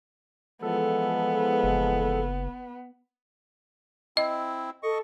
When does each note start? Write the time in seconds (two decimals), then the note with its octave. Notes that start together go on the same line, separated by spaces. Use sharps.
0.62 E3 F3 G#3 B3 A4
1.64 F#1
4.17 C4 E4 D#5
4.83 A4 D#5 C#6